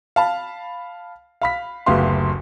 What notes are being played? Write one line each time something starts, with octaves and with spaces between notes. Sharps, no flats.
F5 A5 B5
F5 B5 B6
F#1 D2 B3 G4 F5 C6